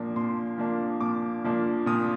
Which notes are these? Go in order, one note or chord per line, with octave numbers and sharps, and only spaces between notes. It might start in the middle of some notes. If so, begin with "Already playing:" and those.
Already playing: A#2 F3 A#3 D4
A#2 C6
F3 A#3 D4
A#2 D6
F3 A#3 D4
A#2 D#6